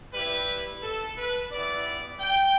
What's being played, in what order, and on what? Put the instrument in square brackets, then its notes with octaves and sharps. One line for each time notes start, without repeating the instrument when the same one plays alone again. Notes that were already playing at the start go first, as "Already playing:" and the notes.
[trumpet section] G3 E4 G4 B4
A4
B4
G3 B3 E4 D5
G5